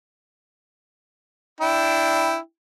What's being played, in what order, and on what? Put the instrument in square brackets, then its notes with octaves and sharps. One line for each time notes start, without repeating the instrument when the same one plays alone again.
[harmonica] D4 E4 G5